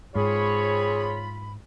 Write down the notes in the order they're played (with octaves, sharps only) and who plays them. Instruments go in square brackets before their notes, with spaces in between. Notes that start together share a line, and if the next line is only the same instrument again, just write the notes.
[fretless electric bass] G#2 [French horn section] C4 C#5 [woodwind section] F4 B5 [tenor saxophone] G#4